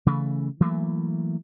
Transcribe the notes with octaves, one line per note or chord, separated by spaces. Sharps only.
C#3 E3 A3
E3 F#3 A3 A#3